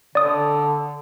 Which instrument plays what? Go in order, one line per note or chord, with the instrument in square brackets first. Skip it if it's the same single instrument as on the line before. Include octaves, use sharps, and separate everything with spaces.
[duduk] D3 [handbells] D5 D#6